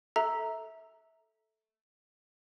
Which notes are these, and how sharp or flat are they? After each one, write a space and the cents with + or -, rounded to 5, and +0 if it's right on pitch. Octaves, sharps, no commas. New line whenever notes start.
A4 +0 E5 -15 A#5 +0